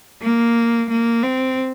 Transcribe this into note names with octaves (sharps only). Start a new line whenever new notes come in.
A#3
A#3
C4